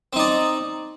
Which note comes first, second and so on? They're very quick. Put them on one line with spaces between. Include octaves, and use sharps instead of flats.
C4 D#4 D5